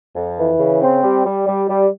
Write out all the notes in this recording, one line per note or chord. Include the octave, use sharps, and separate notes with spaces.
F2
E3
C#3
C4
G3
G3
G3
G3